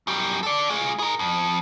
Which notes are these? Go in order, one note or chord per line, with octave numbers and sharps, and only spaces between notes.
F#2 G3
A4 D5
G#3 F4
G#4 A#4
F2